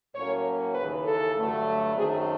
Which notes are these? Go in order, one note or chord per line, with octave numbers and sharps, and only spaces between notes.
A2 F#3 A#3 C#4 C#5
D#2 C#3 E3 B4
A4
G2 D3 F#3 A3
F#2 D#3 F#3 A3 C4 G#4